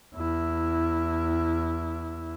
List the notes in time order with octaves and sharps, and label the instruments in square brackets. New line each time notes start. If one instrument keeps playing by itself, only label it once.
[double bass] E2 E4